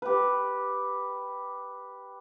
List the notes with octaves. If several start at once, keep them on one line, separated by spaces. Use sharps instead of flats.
G4 B4